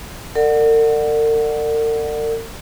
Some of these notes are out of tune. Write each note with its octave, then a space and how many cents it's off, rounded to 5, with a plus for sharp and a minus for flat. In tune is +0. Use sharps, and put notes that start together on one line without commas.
A#4 -45 D5 +30 F#5 +0